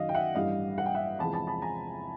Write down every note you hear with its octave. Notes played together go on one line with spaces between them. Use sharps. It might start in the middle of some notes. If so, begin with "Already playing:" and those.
Already playing: F#2 D#3 F#3 D#5 F5
G5
E5 F#5
A1 G2 E3 G3 D#5 F5
F#5
G5
E5 F#5
E2 C3 F3 G#3 A5 B5
A5 B5
A5 B5
G#5 A#5